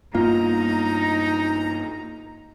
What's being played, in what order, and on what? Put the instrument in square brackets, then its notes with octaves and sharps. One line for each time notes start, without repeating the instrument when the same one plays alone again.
[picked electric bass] G2 A#3 B3 [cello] D#4 [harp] F4 [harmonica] A#5